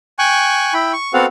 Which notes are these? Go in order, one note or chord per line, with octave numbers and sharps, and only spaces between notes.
G5 G#5 C#6 F#6
E4 G5 B5
C#6
B3 C4 F#4 A4 F5 F#5